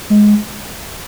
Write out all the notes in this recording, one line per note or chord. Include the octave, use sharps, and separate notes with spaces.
G#3